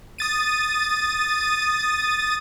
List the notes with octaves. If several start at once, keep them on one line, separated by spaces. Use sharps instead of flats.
D#6 A6 D#7